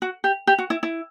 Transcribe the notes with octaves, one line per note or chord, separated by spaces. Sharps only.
F#4
G4
G4
F#4
E4
E4